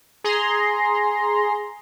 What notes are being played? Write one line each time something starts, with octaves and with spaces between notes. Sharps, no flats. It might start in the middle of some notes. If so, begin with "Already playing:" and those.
G#4 A#5 C6